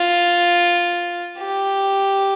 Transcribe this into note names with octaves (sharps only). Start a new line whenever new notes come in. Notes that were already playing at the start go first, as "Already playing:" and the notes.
Already playing: F4
G4